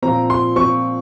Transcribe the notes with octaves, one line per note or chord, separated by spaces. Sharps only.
A#2 F3 C4 A#5
C6
A#2 F3 C4 C#6